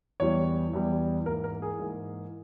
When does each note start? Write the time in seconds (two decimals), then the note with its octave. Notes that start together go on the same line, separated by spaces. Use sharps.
0.20 E2 E3 G3 C#5
0.73 E2 E3 G3
1.26 G#2 E3 A#3 A#4
1.44 A#4
1.62 G#4
1.79 G#2 E3 A#3